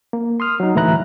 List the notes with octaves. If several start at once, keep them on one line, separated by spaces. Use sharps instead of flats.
A#3
C6 D#6 F6
F#3 D#4
D2 A2 E3 E4 A#5 F#6